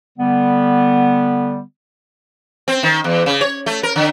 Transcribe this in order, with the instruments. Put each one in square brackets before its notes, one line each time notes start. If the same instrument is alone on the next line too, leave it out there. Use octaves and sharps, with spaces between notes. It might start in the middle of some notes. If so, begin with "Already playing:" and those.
[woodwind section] D3 G3 B3
[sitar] C4
D#3
E2
C#3
C#5
A3
A#4
D3